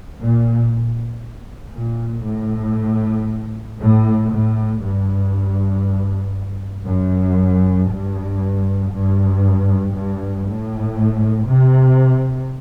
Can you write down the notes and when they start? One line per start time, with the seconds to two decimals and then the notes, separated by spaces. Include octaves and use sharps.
0.21 A#2
1.75 A#2
2.26 A2
3.81 A2
4.32 A2
4.83 G2
6.88 F#2
7.91 G2
8.92 G2
9.95 G2
10.47 A2
11.50 C3